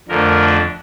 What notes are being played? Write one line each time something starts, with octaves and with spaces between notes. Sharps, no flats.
F2 D3 F3 A3 D4 A#4